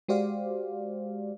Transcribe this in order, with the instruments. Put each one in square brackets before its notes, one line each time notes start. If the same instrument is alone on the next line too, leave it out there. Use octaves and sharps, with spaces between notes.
[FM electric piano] G#3 F#4 G4 C5 D5 F5